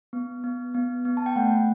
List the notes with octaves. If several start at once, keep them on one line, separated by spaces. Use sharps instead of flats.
B3
B3
B3
B3
A5
G5
A3 F#5